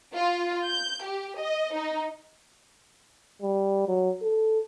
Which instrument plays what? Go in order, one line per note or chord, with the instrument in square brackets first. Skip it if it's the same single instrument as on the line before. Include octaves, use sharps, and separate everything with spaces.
[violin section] F4
G6
G4
D#5
D#4
[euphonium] G3
F#3
A4